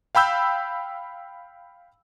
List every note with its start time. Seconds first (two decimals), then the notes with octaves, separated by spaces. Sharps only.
0.15 F5 G5 B5 E6 G6